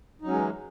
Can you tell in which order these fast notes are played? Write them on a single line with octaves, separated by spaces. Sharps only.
D#4 F#3 C#4 G#3 E3